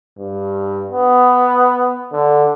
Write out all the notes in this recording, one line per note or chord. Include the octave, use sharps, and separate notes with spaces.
G2
B3
D3